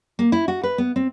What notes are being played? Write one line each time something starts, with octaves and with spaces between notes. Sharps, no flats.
A#3
E4
F#4
B4
B3
C4